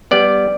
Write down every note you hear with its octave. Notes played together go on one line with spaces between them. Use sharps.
G3 B3 D5